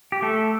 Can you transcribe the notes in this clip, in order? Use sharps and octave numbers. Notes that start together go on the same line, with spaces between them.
G4
A3 A4